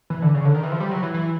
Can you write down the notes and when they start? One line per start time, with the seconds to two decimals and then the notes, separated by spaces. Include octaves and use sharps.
0.10 E3
0.22 D3
0.34 C#3
0.45 D3
0.54 D#3
0.63 E3
0.72 F3
0.80 G3
0.91 F#3
1.03 E3
1.14 E3